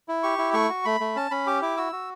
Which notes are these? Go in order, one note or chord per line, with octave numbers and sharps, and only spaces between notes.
E4
G4 C#6
E4
A3 C#6
F#4
A3 B5
A3
C#4 A5
C#4 B5
G4 D6
E4 D6
F#4 E6
F#4